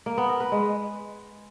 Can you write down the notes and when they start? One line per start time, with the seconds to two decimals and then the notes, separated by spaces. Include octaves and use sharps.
0.06 A#3
0.18 B3
0.29 A#4
0.40 B4
0.52 G#3